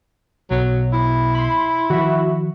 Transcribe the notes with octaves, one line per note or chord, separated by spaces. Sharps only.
B1 B2 F#3
E4
B5 C6
D#3 F3 F#4 E5